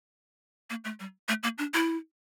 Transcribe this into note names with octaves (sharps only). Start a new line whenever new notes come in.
A#3
A3
G3
A3
A#3
D4
E4